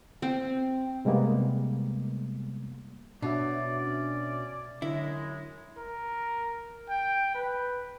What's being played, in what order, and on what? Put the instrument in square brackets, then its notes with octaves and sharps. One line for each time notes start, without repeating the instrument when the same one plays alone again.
[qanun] C4
[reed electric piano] C3 G3 G#3 A#3 B3
[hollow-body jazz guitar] B2 [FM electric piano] D4 F#4 E5 [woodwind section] E4 C#5 D5
[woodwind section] C#4 D5
[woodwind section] F#2 F#3 G#3 [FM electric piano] D3 [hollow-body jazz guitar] E4
[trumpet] A#4
G5
B4